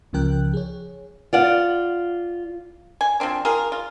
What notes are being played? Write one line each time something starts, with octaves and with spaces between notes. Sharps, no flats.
C#2 C#3 F3 A#4 G5 F#6
G#4 C#5
F4 D5 F#5
G#5
F3 A#3 C4 D4
F4 G#4 A#4
F4